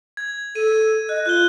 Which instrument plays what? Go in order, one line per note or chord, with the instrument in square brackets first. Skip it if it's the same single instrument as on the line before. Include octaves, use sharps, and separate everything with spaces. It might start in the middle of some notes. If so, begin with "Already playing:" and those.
[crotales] G#6
[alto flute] A4 [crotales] D#7
[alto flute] D#5 [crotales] F#6
[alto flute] F4 [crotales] F#6 G6 G7